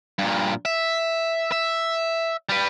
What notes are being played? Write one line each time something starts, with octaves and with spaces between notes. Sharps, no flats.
G2 A#2
E5
E5
G3 B4